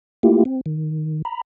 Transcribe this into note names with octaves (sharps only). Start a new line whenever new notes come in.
A3 A#3 E4 F4 G4
C4
D#3
A#5 B5